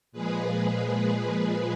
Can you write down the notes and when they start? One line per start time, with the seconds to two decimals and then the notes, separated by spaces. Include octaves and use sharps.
0.12 A#2 F3 G#3 G#4 B4
1.28 G#4 B4